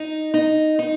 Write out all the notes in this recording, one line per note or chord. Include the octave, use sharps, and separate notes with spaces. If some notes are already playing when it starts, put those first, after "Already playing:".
Already playing: D#4
D#4
D#4